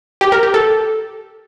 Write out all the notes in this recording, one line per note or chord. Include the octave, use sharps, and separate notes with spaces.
G4
A#4
G4
A4